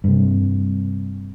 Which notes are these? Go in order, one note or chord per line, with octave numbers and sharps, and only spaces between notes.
G2 C3